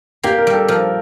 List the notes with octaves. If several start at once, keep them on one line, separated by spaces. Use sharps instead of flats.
A#3 G4
A#4
G3
A4
F3 A#4